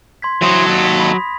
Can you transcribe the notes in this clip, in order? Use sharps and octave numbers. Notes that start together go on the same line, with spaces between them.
C6 G#6 B6
E3 F#3 C5 D#6 A#6
D#2 A4
G#6 B6
B5